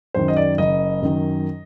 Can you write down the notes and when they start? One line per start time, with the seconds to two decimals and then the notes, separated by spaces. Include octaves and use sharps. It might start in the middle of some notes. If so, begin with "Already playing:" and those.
0.14 F#2 D#3 C5
0.28 D#5
0.36 D5
0.58 F#1 D#5
1.02 F#2 D#3